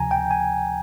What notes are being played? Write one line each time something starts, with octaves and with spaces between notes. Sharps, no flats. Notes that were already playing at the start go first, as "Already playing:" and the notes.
Already playing: D2 C3 F3 G#5 A#5
G5
G#5